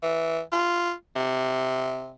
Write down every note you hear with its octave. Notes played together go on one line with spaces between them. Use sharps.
E3
F4
C3